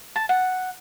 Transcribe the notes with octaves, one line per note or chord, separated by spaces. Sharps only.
A5
F#5